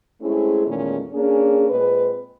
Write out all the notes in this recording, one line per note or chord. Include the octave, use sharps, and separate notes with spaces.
G#3 A3 C4 C#4 E4 G#4
E2 A#2 D#3 G#3 A3 C#4
A#3 C#4 D4 G#4
A#2 G#3 C4 B4